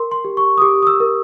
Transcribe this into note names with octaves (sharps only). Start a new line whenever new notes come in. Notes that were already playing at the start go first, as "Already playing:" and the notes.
Already playing: A#4 C6
C6
G4
C#6
D#6
G4 D6
D#6
E6
A#4